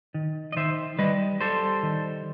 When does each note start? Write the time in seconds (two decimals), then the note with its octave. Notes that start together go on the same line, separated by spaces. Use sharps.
0.14 D#3
0.52 D#5
0.56 D#3 C5 E5
0.99 G3 B4 D#5
1.40 G3 A4 C5
1.83 D#3